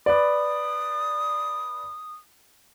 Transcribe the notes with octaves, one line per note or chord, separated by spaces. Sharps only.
B4 D5 D#6